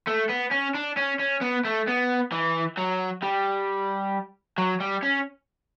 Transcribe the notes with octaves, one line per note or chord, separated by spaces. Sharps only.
A3
B3
C#4
D4
C#4
C#4
B3
A3
B3
E3
F#3
G3
F#3
G3
C#4